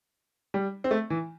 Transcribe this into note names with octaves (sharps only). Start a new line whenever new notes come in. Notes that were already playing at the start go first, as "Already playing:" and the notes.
G3
C4
A3
E3